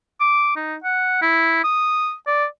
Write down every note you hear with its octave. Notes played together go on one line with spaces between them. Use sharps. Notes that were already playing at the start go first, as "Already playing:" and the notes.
D6
D#4
F#5
E4
D#6
D5